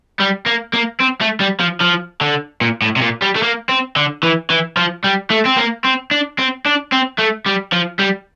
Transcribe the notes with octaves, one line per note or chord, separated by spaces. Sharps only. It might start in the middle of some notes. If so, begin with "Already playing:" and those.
G3
A#3
A#3
C4
A3
G3
F3
F3
D3
A#2
A2
C3
A#2
G3
A3
A#3
C4
D3
E3
E3
F3
G3
A3
C4
A#3
C4
D4
C4
D4
C4
A3
G3
F3
G3